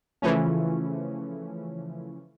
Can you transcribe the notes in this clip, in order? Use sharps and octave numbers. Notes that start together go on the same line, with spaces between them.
C#3 E3 F3 A3 C#4